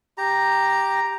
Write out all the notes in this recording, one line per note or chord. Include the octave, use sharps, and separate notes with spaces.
G4 A#5